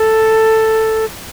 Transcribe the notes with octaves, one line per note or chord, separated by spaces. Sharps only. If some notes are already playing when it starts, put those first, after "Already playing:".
Already playing: A4